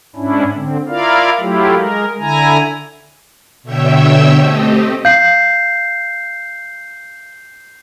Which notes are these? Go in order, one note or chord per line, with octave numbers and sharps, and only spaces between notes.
G#2 C#4 D4 E4
D3 C4
E4 F4 A#4 D5 F5
F#3 A3 E4 F4 G4
G#3 A#4
D3 E4 G#5 A#5
B2 D3 C#5 E5 G5 E6
A3 C4 G4 D#5
F5 G6 C7